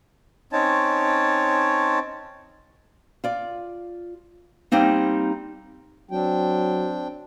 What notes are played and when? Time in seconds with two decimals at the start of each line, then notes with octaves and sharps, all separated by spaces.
0.53 C4 C#4 D#4 C#5 A5
3.24 F4 D5
4.72 G3 A#3 C4 D#4
6.11 F#3 C4 D4 G5